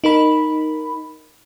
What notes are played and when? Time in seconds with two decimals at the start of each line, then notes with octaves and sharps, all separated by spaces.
0.04 D#4 A#4 B5